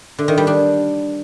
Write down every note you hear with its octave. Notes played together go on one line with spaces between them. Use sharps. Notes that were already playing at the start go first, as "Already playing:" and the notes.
D3
D#3
G3
D4